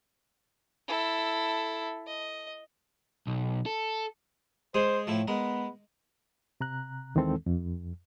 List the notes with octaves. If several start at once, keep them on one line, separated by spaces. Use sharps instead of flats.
E4 A4
D#5
B1
A4
G#3 G#4 C5 G#5
A2 F3 A3 E4
G#3 B3 A#4
C3 A#5 F#6
D#2 D#3 E3 G#3 C4 A4
F2